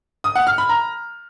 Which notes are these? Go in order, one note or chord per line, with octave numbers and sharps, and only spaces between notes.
D#6
F#5
F6
B5
A#5